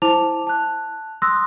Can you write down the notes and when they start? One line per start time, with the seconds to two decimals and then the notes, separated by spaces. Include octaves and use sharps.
0.02 E4 C5 A5 D6 F7
0.47 A5 F#6
1.22 C6 D#6 E6 F#6 A#6